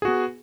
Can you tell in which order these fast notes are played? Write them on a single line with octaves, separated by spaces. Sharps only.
G#4 F#4 B3